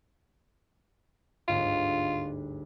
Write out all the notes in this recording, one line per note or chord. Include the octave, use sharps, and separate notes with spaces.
G1 D2 G#2 F4